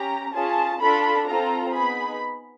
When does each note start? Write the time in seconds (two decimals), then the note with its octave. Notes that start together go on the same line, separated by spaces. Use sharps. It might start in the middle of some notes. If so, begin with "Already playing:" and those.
Already playing: C#4 G4 A#5
0.33 C#4 F4 G#4 A5
0.81 D4 F4 A4 B5
1.27 C4 F4 A4 A#5
1.74 B3 D#4 G#4 B5